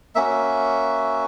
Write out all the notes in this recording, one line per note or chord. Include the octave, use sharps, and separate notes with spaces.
A#3 C#4 F#4 E5